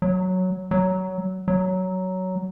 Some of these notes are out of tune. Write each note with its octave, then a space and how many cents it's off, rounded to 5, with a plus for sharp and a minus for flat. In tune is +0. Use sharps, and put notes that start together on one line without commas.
F#3 +0
F#3 +15
F#3 +10